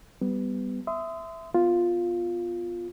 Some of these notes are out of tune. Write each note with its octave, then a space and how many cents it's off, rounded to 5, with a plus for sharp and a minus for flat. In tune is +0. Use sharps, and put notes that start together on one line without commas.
G3 +0 B3 +15
E5 +0 C6 -35 D#6 +10
B3 +0 F4 +5